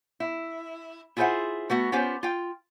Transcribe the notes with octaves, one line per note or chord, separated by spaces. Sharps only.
E4
E4 F4 G#4 C5 E5 F#5
A3 B3 F#4
B3 C#4 F4 G4 C5
F4 G5